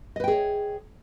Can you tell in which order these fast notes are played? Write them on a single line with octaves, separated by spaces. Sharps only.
D#5 B4 G5 G#4 C#5